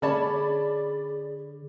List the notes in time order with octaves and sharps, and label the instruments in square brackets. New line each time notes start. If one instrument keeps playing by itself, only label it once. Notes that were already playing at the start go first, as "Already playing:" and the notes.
[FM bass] D3 [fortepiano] C#4 C#5 A5 [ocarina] G#4 [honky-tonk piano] D5 B5